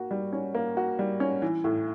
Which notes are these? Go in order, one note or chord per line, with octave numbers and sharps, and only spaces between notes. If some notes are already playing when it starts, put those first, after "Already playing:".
Already playing: A#3 F#4
G3
C#4
A#3
F#4
G3
C#4
E3
A2